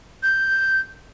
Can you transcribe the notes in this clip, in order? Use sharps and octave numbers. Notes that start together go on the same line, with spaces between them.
G6